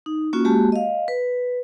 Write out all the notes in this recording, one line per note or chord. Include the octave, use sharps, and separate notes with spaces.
D#4
A#3 C#4 F4 F#4
G#3 A#3 F#4 G4 A5
D#5 F5
B4